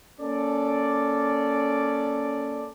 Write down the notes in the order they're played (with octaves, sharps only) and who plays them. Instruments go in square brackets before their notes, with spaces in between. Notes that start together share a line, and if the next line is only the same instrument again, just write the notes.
[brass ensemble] A#3 C#4 A4 D5